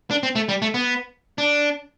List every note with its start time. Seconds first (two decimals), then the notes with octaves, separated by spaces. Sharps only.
0.11 D4
0.23 C4
0.35 A3
0.49 G3
0.62 A3
0.74 B3
1.38 D4